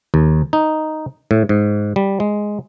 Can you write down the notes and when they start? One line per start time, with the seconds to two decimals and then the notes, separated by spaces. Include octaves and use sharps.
0.14 D#2
0.53 D#4
1.31 A2
1.49 G#2
1.96 G3
2.20 G#3